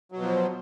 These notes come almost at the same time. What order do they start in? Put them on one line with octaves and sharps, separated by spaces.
F#3 B2 F3